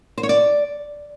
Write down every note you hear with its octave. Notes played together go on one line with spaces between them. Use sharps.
C5
C#5
D5